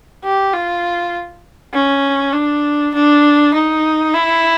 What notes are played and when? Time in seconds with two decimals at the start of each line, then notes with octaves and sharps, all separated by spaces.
0.24 G4
0.53 F4
1.74 C#4
2.33 D4
2.94 D4
3.54 D#4
4.14 E4